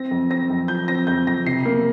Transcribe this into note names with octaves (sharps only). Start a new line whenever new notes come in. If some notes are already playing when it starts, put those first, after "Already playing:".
Already playing: C4 A#6
F2
C4 A#6
F2
F3 G6
C4 A#6
F2 G6
F2 A#6
C3 C7
A#3